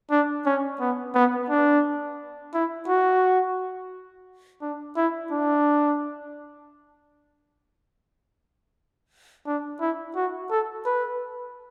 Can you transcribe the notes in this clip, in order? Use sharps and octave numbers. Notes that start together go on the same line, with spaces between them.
D4
C#4
B3
B3
D4
E4
F#4
D4
E4
D4
D4
E4
F#4
A4
B4